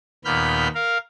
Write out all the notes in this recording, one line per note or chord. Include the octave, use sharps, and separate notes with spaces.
D#2 A#2 B3 B5 F6 G6
A#4 F5